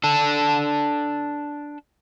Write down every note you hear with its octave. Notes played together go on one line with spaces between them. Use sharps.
D4 A4